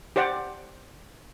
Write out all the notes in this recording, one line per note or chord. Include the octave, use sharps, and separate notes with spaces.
G4 C5 D5 F#5